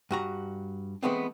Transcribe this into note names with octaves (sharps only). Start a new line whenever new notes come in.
G2 F#4 A#5
E3 G#3 A3 B3 C4